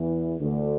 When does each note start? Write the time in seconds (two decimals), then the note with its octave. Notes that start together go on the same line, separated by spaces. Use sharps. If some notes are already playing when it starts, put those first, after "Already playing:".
Already playing: E2 E3
0.41 D2 D3